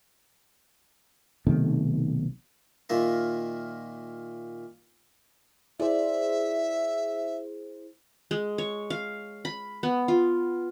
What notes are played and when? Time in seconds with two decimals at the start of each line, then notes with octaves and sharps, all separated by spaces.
1.47 B1 C3 D#3 A3
2.89 A#2 D#3 A#3 F4 E5 A#5
5.80 E4 G#4 C5 D5 E5
8.31 G#3
8.58 C#5
8.90 F5
9.45 B5
9.83 B3
10.08 F4